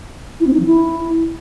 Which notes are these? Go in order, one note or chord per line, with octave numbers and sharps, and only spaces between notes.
E4
C4
D#4
F3
E4